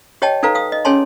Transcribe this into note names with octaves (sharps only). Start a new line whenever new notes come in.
G4 C#5 D#5 G5 A5
D#4 A4 B4 F5 A#5
F5 D#6
D#5
C#4 G#4 C#5 G#5 A5 C6